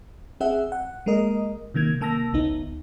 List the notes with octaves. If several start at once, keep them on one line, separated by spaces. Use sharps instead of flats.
C4 G#4 E5 F#5
F#5
G#3 A#3 A#4 D#5
C3 D#3 A#3 G#6
C3 A#3 A5 E6 A#6
A1 D2 B3 D#4